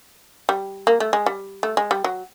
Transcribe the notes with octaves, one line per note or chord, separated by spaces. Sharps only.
G3
A#3
A3
G#3
G3
A3
G#3
G3
F#3